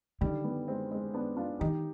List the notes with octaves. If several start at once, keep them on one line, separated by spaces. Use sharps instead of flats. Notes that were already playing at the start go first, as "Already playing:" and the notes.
D3 D#3 G3
G3 B3
G#3 C4
G#3 C4
B3 D4
D4 F4
D#3 D#4 G4